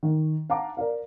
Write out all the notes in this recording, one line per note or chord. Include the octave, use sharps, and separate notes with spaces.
D#3
F5 F#5 A5 A#5 D6
A#4 D5 F5